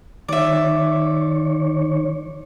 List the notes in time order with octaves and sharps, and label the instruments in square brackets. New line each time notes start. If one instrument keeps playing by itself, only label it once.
[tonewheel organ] D#3 C#5 [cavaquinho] D5 E5